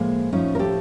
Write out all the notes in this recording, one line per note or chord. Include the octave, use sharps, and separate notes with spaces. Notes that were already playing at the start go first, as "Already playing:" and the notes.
Already playing: A2 F3 G#3 A#3
A2 F3 C#4 D#4
A#4
G4 A4